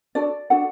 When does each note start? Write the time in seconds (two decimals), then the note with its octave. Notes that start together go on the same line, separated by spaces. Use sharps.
0.15 D4 F#4 A4 D5
0.50 D4 F#4 A4 F#5